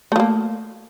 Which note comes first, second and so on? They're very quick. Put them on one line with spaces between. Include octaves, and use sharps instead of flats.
A3 F3 A#3